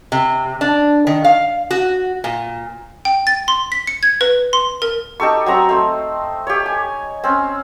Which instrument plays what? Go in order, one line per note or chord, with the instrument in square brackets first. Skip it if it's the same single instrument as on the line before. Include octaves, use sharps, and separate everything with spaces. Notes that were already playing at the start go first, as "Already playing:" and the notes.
[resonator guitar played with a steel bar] C3
D4
D#3
F5
F#4
A#2
[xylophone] G5
A6
C6
B6
C#7
G#6
B4
C6
A#4
[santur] D#4 G4 A4 C#6
F#3 C4 A#5 C#6
A3 C4
G4 C#5
G#5
C4 C#4